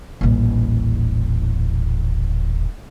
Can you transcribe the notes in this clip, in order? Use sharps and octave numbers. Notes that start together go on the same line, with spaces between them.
D#1 A1